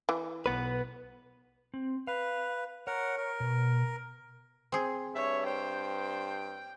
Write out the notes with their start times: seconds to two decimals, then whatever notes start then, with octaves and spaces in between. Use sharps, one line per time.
0.09 E3
0.46 B1 B3 B4
1.74 C4
2.07 B4 F5
2.87 A#4 C#5 F#5
3.18 A#4
3.40 B2
4.72 C4 G#4
5.15 G2 C#5 E5
5.46 C5 G5